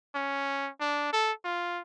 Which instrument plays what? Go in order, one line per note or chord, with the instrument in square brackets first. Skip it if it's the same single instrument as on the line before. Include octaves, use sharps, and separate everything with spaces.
[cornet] C#4
D4
A4
F4